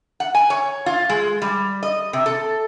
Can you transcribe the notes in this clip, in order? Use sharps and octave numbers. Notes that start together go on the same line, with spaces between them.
F#5
G#5
C#5
F4
G#3
G3
D#5
C3
A4